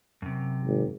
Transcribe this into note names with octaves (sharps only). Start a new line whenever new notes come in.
F#2 C3
G#1